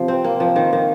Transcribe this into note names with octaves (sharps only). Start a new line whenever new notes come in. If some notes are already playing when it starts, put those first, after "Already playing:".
Already playing: C3 F3
C4
A#3
F3
D#3
D#3